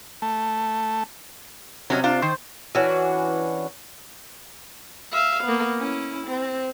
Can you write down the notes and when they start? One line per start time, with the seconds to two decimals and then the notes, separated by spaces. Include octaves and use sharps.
0.22 A3
1.90 C3 F#3 C#4 D#5
2.04 D4 F4
2.22 D#3 C5
2.75 E3 C#4 D4 F#4
5.11 E5 F5
5.44 A#3 B3
5.78 C#4 E4
6.27 C4